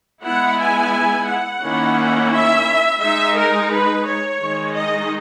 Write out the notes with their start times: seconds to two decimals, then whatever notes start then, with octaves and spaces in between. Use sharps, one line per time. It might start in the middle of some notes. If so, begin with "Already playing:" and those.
0.24 G#3 B3 E4 F#5
0.59 G#5
1.27 F#5
1.62 D#3 A#3 C#4 E4
2.33 E5
3.01 G#3 D#4 E5
3.36 A#4
3.72 B4
4.06 C#5
4.41 D#3 G#3 D#4
4.75 D#5